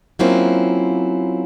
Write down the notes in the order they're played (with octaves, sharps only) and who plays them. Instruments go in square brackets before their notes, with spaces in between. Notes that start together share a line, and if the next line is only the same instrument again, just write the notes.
[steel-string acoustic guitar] F#3 A#3 C4 C#4 E4 F4